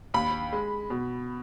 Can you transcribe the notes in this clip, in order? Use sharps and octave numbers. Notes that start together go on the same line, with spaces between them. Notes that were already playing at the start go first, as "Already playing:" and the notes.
D#2 B5
G#3
B2